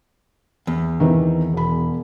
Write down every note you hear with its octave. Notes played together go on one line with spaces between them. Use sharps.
E2
D#3 E3 C4
E1 B5